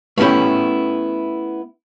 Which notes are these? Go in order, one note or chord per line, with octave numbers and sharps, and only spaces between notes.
A3 B3 C#4 E4 G4